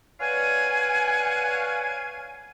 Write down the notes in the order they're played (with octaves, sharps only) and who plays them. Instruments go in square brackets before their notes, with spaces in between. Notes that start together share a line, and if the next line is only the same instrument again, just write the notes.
[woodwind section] B4 C#5 D5 F5 F#5 G#5